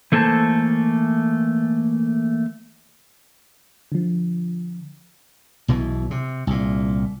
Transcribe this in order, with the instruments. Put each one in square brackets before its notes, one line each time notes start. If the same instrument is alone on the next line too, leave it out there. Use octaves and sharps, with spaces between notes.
[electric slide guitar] E3 A3 A#3 A4 C5 A5
[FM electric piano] D3 F3
[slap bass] B1 B2 E3
C3
C2 A#2